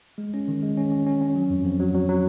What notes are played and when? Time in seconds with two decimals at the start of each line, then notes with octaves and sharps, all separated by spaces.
0.18 G#3
0.34 C#4
0.48 D#3
0.63 G#3
0.77 C#4
0.92 C#4
1.07 C#4
1.21 C#4
1.36 F#3
1.50 F2
1.65 F2
1.80 F#3
1.95 F#3
2.09 F#3